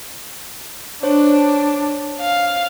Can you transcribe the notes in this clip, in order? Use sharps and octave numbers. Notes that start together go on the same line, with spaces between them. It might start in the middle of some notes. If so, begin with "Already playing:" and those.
D4 C5 C#5
F5